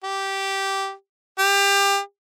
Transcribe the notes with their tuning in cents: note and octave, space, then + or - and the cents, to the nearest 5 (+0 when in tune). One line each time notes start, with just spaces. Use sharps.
G4 -10
G4 +25